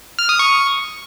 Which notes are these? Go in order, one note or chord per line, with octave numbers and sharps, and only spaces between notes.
F6
D#6
C#6